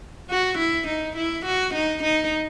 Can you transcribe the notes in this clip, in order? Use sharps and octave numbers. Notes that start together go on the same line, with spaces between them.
F#4
E4
D#4
E4
F#4
D#4
D#4